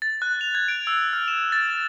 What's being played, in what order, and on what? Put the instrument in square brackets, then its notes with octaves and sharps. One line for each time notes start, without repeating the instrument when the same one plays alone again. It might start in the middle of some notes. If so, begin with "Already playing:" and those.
[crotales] A6
F#6
F7
G#6
D7
E6
F6
E7
A6